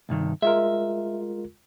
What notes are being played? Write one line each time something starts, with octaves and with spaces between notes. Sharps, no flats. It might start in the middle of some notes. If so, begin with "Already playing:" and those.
C2 G2 D#3
G#3 F4 A#4 E5